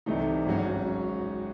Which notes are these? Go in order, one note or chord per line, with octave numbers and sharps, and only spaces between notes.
C2 C3 E3 A3 D#4
G#1 G#2 F#3 C#4 F#4